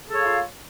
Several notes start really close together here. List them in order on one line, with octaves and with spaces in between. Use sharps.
G#4 A4 C#5 F5 F4